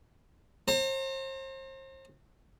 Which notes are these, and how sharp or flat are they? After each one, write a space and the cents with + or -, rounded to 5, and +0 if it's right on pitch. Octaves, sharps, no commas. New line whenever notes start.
C5 +35 A#5 -35